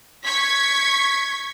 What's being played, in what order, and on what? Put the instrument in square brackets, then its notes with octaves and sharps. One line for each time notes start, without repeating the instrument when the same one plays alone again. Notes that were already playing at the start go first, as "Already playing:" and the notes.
[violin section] C#6 G#6 B6